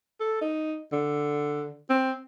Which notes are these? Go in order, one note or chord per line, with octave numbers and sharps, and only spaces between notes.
A4
D#4
D3
C4